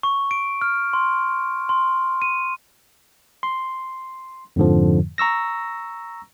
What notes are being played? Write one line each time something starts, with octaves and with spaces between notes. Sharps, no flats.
C#6
D7
F6
C6
C6
D#7
C6
F2 G#2 D3 F3
A#5 C#6 E6 A#6